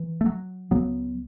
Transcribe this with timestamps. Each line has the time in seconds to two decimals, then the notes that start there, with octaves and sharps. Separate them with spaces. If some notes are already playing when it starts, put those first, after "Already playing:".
Already playing: E3
0.21 A3
0.26 F#3
0.71 C#2 C#3 F#3 B3